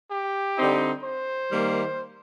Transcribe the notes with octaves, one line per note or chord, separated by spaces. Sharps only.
G4
D3 G3 C4 D#4
C5
D#3 G3 A#3